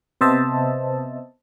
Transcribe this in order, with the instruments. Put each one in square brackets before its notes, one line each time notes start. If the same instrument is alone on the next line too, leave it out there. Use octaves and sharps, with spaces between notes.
[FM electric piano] C3 B3 C5 D#5 E5 A5